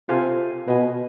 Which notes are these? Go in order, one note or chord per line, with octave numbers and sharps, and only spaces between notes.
C3 F4 A4 C5 F5 G#5
B2 B4 D#5 G#5